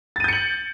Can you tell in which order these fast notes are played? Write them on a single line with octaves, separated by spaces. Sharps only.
A6 D#7 G6 C#7 F#7